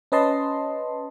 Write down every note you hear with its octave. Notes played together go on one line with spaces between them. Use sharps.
C#4 B4 D#5 A5 C6